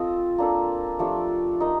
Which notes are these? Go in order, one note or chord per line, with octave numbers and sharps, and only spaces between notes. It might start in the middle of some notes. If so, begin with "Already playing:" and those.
Already playing: C4 F4 A4 D#5
A#3 D4 A4
F3 A3 D4 G4
D#4 A#4 D#5